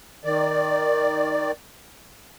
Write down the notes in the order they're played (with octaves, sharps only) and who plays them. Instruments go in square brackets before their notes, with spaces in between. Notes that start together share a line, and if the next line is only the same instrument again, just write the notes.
[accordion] D#3 D5